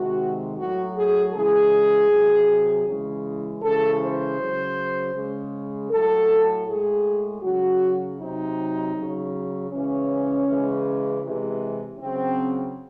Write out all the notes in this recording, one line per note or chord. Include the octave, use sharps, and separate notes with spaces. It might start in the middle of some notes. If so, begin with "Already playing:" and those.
Already playing: C3 D#3 G#3 F#4
A2 F#3 F#4
G#4
C#3 E3 G#3 G#4
C3 F#3
C#3 E3 G#3
C#3 E3 G#3 A4
C5
C#3 F#3
C#3 G#3
A2 F#3 A4
A2 G#3 G#4
C#3 F#3 F#4
C3 F#3 D#4
C#3 F#3
C#3 E3 G#3 C#4
C#3 E3 G#3
C3 E3 G#3
C#3 F#3 C4